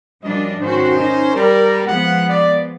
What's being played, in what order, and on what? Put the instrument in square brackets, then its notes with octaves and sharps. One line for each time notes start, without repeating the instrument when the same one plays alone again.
[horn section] F#2 D#5 [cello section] F3 G3 D4
[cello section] G#2 D#3 F#4 [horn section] C#4 C5
[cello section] D#4
[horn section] G3 [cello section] A#4
[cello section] F3 G#3 B3 [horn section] F#5
[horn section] D5